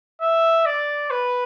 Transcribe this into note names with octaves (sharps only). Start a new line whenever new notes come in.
E5
D5
B4